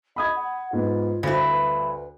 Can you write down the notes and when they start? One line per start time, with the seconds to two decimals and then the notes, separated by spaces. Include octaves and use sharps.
0.16 D#5 B5 D#6 G#6
0.36 F#5
0.73 G#2 B3 F4
1.23 D2 G2 E4 C5
1.49 B4